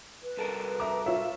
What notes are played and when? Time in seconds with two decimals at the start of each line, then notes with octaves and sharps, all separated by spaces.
0.23 B4
0.37 C2 A4 A#4
0.80 E5 A#5 D6
1.06 F4 C#5 E5